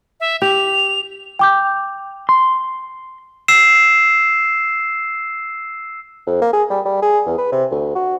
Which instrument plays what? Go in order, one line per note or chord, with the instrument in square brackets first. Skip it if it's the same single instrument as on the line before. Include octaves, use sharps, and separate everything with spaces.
[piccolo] E5
[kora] G4 [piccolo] F7
[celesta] G5 D6 G6
[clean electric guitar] C6
[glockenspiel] E6 C7 E7
[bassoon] F2
A#3
G#4
G3
G3
G#4
E2
B4
C3
D2
F#4